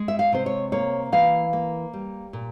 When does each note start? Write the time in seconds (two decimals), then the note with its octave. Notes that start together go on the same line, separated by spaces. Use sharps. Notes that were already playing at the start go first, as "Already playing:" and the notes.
Already playing: G#3
0.08 E5
0.19 F5
0.32 C3 C5
0.46 C#5
0.72 A#3 C#5
1.12 E3 F5
1.53 A#3
1.93 G3
2.33 A#2